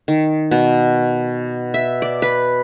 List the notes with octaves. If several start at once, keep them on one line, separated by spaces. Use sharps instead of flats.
D#3
B2
E5
D5
B4